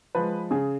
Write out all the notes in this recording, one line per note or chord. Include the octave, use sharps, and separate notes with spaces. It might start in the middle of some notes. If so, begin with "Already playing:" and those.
F3 G#3 B4
C#3 G#4